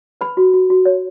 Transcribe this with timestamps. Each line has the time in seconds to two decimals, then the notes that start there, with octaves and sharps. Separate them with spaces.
0.21 B4 B5
0.37 F#4
0.53 F#4
0.70 F#4
0.85 C#5